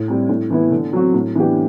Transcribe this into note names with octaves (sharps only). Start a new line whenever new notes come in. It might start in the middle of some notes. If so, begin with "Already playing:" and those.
Already playing: A2
G3 C4
A2
E3 B3 E4
D3
F#3 C4 F#4
A2
E3 B3 D4 G4